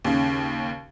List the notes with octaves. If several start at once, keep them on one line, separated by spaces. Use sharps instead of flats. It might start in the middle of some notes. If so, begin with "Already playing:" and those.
D#2 C#3